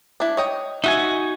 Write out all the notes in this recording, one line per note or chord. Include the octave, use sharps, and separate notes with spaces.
D4 E4
C#5 D#5 G5
D#4 F#4 E5 G#5